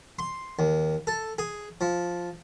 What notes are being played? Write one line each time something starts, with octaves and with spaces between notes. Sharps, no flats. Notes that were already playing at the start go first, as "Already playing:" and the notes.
C6
D#2
A4
G#4
F3